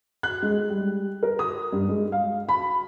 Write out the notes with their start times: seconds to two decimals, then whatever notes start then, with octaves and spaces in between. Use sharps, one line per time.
0.23 F#6
0.42 G#3
0.70 G3
1.23 A#4
1.39 D#6
1.73 G2
1.88 G#3
2.12 F5
2.49 B5